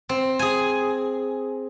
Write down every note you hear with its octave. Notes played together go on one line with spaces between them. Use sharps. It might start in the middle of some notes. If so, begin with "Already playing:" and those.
C4
G#4 G#5